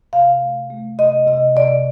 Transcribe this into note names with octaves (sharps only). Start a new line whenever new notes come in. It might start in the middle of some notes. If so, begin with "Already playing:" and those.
C3 F5
A3
A3
C3 D#5
C3 D#5
C3 D5